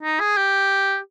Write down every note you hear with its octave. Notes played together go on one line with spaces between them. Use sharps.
D#4
G#4
G4